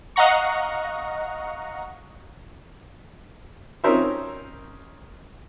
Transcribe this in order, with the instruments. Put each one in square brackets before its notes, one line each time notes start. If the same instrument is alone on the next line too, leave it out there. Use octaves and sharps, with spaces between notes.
[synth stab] D#5 F5 F#5 A#5 C#6
[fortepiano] C4 C#4 D#4 A#4 C5 E5